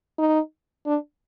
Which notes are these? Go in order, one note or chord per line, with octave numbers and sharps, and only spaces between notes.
D#4
D4